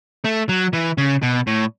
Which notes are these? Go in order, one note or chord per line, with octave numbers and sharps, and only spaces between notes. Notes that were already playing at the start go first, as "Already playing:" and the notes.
A3
F#3
E3
C#3
B2
A2